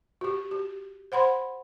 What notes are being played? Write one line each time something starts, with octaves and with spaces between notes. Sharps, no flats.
F#4 G4
G4
C5 F#5 B5 C6